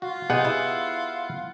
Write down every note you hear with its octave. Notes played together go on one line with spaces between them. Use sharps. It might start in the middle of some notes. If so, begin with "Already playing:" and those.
F4 F#4
C3 B3 D#4 G4 G#4 F#5 G#5
E4